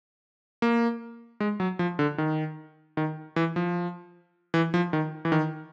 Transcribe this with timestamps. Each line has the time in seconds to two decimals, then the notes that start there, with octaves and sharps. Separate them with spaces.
0.62 A#3
1.40 G#3
1.60 F#3
1.79 F3
1.99 D3
2.18 D#3
2.97 D#3
3.36 E3
3.56 F3
4.54 E3
4.74 F3
4.93 D#3
5.25 E3
5.32 D#3